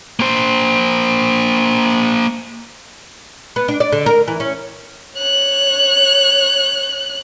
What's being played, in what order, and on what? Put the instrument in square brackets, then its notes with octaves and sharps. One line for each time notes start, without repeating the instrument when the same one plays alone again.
[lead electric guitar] A#3 C5
[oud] B3
D4
D5
D3
A#4
E3
C#4
[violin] C#5 F#6